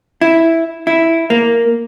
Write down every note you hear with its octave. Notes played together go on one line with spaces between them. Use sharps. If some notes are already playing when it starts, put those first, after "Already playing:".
E4
E4
A#3